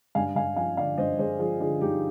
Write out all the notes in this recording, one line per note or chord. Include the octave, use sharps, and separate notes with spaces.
G2 F5 G#5
G2 F5 G#5
F3 F5 G#5
D3 D5 F5
G2 C5 D#5
G2 G#4 C5
F3 F4 G#4
D3 F4 G#4
G2 D#4 G4